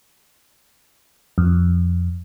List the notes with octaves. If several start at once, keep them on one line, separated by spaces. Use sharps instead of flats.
F2